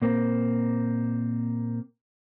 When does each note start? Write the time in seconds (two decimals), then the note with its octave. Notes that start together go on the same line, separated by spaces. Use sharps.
0.02 A#2 A#3 C4